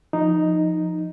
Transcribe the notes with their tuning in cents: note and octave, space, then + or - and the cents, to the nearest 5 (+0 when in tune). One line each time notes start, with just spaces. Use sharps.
F3 +0 D#4 +0